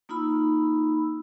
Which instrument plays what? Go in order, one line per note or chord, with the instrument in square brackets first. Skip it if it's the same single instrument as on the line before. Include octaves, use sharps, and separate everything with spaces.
[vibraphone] A#3 D#4 F4 B5 E6